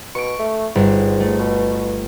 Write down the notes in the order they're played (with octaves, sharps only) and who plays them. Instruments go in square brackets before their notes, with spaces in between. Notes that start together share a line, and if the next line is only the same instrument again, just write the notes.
[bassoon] B2 [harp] C#6 D7
[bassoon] A3
[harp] G1 [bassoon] G#2
[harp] A3
[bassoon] B2